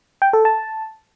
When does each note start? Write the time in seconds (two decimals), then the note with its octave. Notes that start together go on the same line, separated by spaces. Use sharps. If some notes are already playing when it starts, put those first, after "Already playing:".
0.22 G5
0.33 A4
0.45 A5